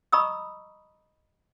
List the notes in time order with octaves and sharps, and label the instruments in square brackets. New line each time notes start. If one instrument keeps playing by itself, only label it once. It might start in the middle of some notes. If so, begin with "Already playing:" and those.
[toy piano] D#5 A#5 B5 C#6 D#6 E6